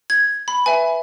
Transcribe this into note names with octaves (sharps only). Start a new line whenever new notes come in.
G#6
B5
B4 E5 G#5